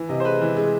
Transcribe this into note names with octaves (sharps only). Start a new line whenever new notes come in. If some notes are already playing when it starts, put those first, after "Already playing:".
Already playing: E3
C3 D#5
C5
G#3 B4
E3
G#3